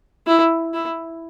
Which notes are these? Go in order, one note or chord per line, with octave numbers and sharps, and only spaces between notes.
E4
E4